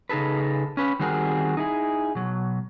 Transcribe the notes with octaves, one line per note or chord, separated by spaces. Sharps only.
C#3 D#4 G#4 A4 B4
C#4 B4
D#3 G3 C4 F#4 G#4 A#4
D#4 E4 G#4
B2 F#3